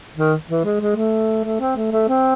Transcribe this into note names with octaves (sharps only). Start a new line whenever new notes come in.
D#3
E3
G#3
G#3
A3
A3
C4
A3
A3
C4